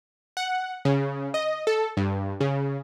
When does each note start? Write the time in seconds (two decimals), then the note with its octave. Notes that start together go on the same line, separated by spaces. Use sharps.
0.37 F#5
0.85 C#3
1.34 D#5
1.67 A4
1.97 G2
2.40 C#3